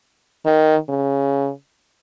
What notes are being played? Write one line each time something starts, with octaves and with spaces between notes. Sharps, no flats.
D#3
C#3